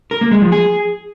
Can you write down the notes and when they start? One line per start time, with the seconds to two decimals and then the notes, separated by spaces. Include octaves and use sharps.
0.11 A#4
0.21 A#3
0.32 G#3
0.42 F3
0.52 G#4